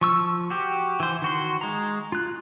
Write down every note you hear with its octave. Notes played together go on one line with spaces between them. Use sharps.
F3 C#6 E6
F#4 G4
E3 C5
D#3 F#4 C6
G#3 A#5
F4 F#6